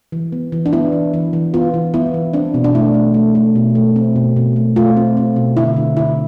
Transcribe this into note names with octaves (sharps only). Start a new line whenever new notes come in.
E3
B3
E3
D4
B3 E4
E3
E3
E3
B3 F4
E3
B3 E4
E3
C4 D4
B2
D4
A3 E4
A3
A3
A3
B2
A3
C4
B2
B2
A3
A3 F4
C4
C4
B2
D3 E4
D3
D3 E4